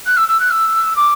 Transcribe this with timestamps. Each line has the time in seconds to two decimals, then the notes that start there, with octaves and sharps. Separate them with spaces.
0.06 F#6
0.17 E6
0.28 E6
0.39 F#6
0.51 E6
0.96 D6